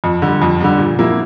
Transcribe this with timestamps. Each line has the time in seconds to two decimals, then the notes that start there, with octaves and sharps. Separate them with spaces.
0.04 F2
0.22 D3 G3
0.42 F2
0.60 D3 G3
0.79 A#2
0.99 F3 A#3 E4